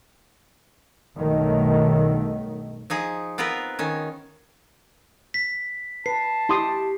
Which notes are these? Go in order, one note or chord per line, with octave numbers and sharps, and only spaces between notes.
B1 G2 D#3 F#3 A3
F3 D#4 G#4
B3 C4 F4 A#4 B4
D#3 C#4
B6
B4 A5 C7
E4 G4 C6 D#6